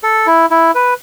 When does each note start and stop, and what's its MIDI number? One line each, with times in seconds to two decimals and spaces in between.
0.03 0.27 69
0.27 0.46 64
0.51 0.71 64
0.75 0.94 71